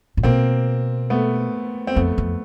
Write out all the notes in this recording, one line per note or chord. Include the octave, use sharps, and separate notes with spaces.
A#2
B2 A#3 C4
A3 B3
C4
F2 A3 B3
F2